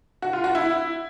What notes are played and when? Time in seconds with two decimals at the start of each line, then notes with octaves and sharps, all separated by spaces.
0.22 F#4
0.33 F4
0.44 F#4
0.55 E4